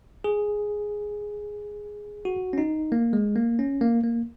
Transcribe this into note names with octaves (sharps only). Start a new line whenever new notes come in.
G#4
F#4
C#4
D#4
A#3
G#3
A#3
C#4
A#3
A#3